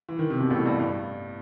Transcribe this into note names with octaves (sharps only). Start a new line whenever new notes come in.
E3
D#3
C3
B2
A1 A2
G2
G2